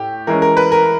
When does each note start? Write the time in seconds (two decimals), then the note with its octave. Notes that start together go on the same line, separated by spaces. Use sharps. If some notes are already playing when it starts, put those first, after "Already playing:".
Already playing: A2 G4
0.27 E3 G#3 C#4 A#4
0.42 A#4
0.57 B4
0.72 A#4